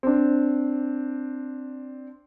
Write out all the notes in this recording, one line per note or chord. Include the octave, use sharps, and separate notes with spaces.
C4 D4